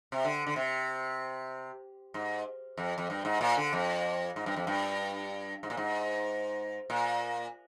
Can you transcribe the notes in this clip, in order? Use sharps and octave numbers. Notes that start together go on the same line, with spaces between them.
C3
D3
D3
C3
G#2
F2
F2
G2
G#2
A#2
D3
F2
G#2
G2
F2
G2
G#2
A#2
G#2
A#2